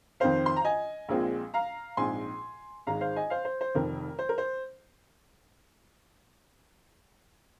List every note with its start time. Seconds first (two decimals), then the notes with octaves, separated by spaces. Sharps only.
0.20 F2 D#3 C4 C5 F5
0.46 C6
0.56 A#5
0.64 D#5 G#5
1.09 A#1 A#2 G#3 C4
1.54 F5 A#5
1.97 A#1 G#2 G#3 C4 G#5 C6
2.87 G#1 G#2 G#3 F5 A#5
3.01 C5 F5
3.16 D#5 G#5
3.30 C5 F5
3.45 C5
3.61 C5
3.74 F1 F2 D#3 C4 A#4
4.19 C5
4.29 A#4
4.38 C5